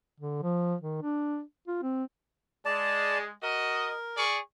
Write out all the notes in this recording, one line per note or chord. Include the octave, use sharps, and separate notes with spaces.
D3
F3
D#3
D4
F4
C4
G#3 D5 A5
F#4 A#4 D#5
G#4 D5 C#6